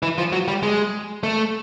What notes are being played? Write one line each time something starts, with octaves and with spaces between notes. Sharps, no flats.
E3
F3
F#3
G3
G#3
A3